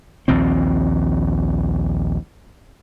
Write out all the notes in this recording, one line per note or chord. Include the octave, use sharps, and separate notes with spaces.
A#1 D#2 A#2 C4